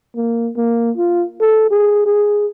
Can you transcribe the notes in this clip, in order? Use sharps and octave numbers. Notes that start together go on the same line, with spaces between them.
A#3
A#3
F4
A4
G#4
G#4